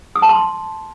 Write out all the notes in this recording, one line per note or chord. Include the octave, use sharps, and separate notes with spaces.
D#6
A5
C6